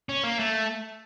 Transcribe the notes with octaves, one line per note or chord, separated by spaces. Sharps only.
C#4
A#3
A3